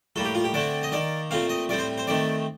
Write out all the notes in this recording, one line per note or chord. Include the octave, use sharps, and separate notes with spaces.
A2 G3 A#3 A4
G4
F4
G4
D3 A3 C4 D5
D#5
D#3 A#3 D5
A#2 A3 C4 F5
D#5
A2 G3 C4 D5
C5
C5
D#3 A3 C4 D5